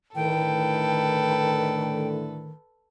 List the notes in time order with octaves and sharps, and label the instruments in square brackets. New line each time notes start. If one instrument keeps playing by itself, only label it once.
[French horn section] A2 D3 A3 [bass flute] D#3 [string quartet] A4 B4 [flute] G5